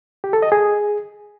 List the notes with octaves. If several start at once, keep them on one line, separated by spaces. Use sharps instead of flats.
G4
A4
D#5
G#4